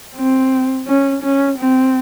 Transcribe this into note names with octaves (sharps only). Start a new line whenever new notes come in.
C4
C#4
C#4
C4